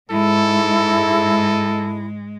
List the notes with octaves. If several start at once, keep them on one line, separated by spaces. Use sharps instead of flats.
G#2 G#3 E4 A4